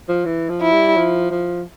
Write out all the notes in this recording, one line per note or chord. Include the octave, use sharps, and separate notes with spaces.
F3
E3
F3
E4
G3
F3
F3